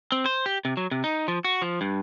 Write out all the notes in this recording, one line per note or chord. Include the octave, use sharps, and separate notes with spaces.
C4
C5
G4
C3
F#3
C3
D#4
F3
F#4
F3
G2